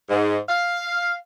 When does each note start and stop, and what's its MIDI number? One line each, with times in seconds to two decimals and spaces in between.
0.09 0.36 44
0.48 1.13 77